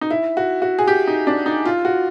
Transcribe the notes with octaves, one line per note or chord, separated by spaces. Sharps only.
D#4
E4
F#4
F#4
G#4
G4
D#4
D4
D#4
F4
F#4